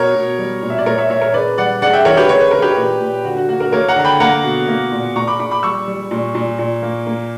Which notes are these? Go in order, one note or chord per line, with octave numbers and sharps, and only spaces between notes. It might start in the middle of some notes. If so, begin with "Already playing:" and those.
Already playing: B2 A#4 C#5
B2
G3
A#2
E5
D5
A#2 A#4 C#5
C#5 E5
A#2 C#5 E5
A#4 C#5
C#3 B4 D5
G3 D5 F#5
C#3 D5 F#5
E5 G5
E3 A#4 C#5
G4 B4
C#3 C#5
B4
C#3 A#4
G4 B4
A#2
A#2
D3 F#4
F#4
A#3 F#4
F#4 A#4
A#3 A#4 C#5
F#5 A#5
D3
G5 B5
A#3 F#5 A#5
B2
A#3
A#2
A#2 A#5 C#6
B5 D6
A#2 B5 D6
B5 D6
G3 C#6 E6
G3
A#2
A#2
A#2
A#3
A#3